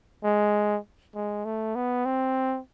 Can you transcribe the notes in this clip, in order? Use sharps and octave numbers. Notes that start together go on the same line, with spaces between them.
G#3
G#3
A3
B3
C4